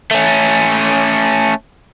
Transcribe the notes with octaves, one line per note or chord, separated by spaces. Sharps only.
A3 C#4